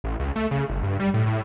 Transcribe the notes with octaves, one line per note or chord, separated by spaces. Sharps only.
A1
C#2
A3
C#3
G1
G2
G3
A2
A2